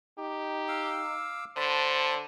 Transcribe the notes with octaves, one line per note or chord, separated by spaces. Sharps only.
D#4 G4
F5 D6 E6
D3 C5 A5 B5